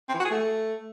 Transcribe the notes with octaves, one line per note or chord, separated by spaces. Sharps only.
C4
E3
F#4
G#4
A3